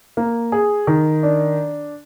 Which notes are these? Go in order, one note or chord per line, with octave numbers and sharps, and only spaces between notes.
A#3
G#4
D#3
D4